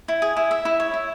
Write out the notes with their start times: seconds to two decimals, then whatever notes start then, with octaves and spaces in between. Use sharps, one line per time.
0.08 E4
0.22 G#4
0.37 E4
0.51 E5
0.65 E4
0.80 C#5
0.94 E4